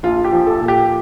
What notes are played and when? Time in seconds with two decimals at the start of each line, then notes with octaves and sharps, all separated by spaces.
0.03 A#1 F4
0.24 G4
0.33 F3
0.47 A4
0.61 A#2
0.68 G4